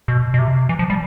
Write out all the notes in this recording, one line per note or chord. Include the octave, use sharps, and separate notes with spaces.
B2
B2
C3
E3
F3
G3